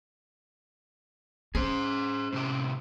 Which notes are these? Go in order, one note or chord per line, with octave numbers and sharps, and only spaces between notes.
C#4 G#4 C5
A2 C3 G4